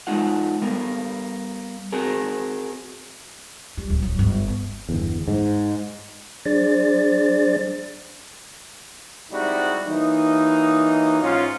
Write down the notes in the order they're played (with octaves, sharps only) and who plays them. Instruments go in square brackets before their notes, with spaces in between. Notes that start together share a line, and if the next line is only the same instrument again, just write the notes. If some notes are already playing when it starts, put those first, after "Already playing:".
[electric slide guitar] G#3 D#4 F4 F#5
G3 A#3 B3
C4 F#4 G#4 A#4
[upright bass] G3
D1
F#3
G1
B3
[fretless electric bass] G1 E2
G#2
[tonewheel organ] F#3 D4 G#4 C5 D5 A6
[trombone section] G3 G#3 C4 D#4 E4 F#4
E3 F#3 A#3 D#4
G#2 C#4 D#4 F4